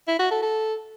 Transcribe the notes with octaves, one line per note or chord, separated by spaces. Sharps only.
E4
F#4
A4
A4